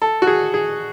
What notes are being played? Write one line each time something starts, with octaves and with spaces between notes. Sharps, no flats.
A4
F#4
G#4
G#4